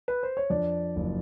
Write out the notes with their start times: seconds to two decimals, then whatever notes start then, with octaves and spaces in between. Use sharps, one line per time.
0.08 B4
0.23 C5
0.37 C#5
0.50 F2 D4 D5
0.96 F#1